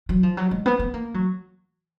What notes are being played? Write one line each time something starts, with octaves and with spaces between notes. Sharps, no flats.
F#3
F3
F#3
G#3
B3
B3
A#3
F#3